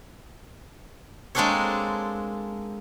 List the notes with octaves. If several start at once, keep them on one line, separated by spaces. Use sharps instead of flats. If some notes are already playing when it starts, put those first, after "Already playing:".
G#3 A#3 C4 D4 A4 C#5